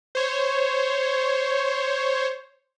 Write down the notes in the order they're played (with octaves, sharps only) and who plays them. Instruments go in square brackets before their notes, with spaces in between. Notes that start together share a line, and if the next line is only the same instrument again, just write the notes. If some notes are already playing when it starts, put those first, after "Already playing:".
[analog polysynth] C5 C#5